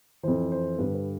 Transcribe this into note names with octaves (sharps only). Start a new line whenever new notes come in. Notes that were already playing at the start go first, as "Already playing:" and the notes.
F2 E3 C5
C5
G2 D3 B4
B4